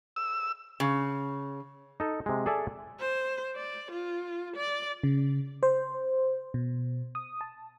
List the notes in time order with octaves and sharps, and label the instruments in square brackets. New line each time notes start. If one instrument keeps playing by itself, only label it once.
[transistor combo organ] E6
[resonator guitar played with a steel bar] C#3
[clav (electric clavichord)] D#4 A4
C3 G#3
G#4 A4 D5 E5 G#5 A5
[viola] C5
D5
F4
D5
[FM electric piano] C#3
C5
B2
D#6
A5